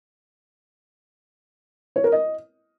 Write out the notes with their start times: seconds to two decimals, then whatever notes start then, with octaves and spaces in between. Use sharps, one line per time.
1.96 C#5
2.04 A#4
2.12 D#5